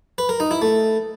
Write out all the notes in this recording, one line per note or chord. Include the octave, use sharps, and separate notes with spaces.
B4
A#4
D#4
E4
A3